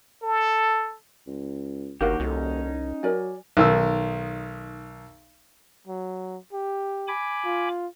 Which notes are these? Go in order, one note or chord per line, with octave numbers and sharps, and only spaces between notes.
A4
C#2
G1 D#2 D4 F#4 G4 A#4 F5
C2 C#4 D#4 F#4 A4
F#3 A#4 D5 G#5
B1 D#3 E6
F#3
G4
G#5 B5 D6
F4